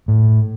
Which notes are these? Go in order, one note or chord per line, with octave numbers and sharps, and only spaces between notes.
A2